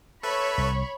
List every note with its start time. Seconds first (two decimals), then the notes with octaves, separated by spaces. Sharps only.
0.23 A4 B4 C#5 E5 B5 C#6
0.58 C2